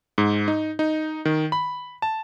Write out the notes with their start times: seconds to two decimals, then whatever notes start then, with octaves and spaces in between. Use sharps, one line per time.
0.18 G#2
0.48 D#4
0.79 D#4
1.25 D#3
1.52 B5
2.02 A5